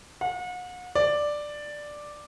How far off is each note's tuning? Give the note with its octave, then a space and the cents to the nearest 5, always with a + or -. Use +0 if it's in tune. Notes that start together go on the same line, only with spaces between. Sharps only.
F#5 -40
D5 +5